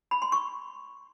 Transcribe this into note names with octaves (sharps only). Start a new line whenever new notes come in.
B5
C6
C#6